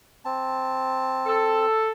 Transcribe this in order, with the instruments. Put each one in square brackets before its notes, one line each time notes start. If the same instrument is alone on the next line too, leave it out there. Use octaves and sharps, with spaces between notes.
[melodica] C4 A5
[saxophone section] A4